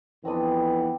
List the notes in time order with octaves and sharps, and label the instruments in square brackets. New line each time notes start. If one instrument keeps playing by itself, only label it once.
[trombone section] F2 E3 B3 [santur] C4 D4 D#6